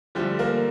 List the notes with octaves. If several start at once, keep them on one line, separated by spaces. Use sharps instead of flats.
D3 F3 G3 A3 G4
A#3 A#4